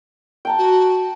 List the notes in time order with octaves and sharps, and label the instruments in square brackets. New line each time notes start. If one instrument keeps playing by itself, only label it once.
[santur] G5 A5 A#5
[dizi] F#4